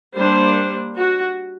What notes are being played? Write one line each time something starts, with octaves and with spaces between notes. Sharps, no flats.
G3 A#3 D4 C5
F#4